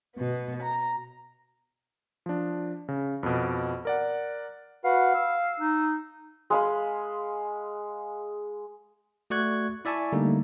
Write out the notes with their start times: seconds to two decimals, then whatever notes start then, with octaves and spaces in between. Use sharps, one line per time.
0.16 B2 B3
0.63 A#5
2.26 F3 D4
2.88 C#3
3.23 F2 B2
3.85 A#4 D5 F#5
4.85 F#4 B4 F5 F#5
5.14 E6
5.60 D#4
6.50 G#3 F5 B5
9.30 A3 F#4 D5 C#6 F#6 G#6
9.85 E4 D5 E5 G#5 A5 C#6
10.12 D3 G3 A3 A#3 D#4